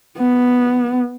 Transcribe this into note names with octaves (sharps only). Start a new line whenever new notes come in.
B3